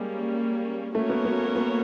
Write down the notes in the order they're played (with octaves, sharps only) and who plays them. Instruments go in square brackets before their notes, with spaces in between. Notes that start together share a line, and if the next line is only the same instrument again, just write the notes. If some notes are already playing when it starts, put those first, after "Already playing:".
Already playing: [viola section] G3 A#3 C#4 [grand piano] G#3
[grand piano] A3 [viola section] A#3 C#4 F#4 A#4 C#5
[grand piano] B3
B3
B3